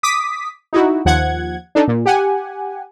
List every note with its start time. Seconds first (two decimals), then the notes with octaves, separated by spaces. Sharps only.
0.03 D6 D#6 B6
0.73 D#4 E4 F#4
1.05 D#2 F3 F#5 G#6
1.75 D4 D#4 A4
1.88 A#2
2.06 G4 F#5 G#5